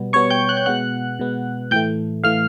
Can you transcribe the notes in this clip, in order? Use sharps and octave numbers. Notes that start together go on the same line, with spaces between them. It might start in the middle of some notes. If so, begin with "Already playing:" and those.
Already playing: B2 G3 B3
B2 G3 B3 C#5 C#6
G5 G6
F#6
G6
B2 G#3 B3 F#5 F#6
B2 G#3 B3
A2 E3 A3 G5 G6
A2 E3 A3 F5 F6